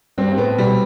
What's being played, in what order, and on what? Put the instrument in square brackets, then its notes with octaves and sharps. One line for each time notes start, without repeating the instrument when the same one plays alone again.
[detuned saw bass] G2 [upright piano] C4
[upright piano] C4
[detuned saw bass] A2 [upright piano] B3
[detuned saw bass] B2 [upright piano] G3